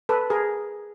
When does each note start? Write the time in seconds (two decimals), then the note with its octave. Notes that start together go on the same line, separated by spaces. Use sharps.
0.09 A4 B4
0.30 G#4 A#4